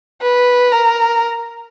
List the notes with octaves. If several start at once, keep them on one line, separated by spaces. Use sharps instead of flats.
B4
A#4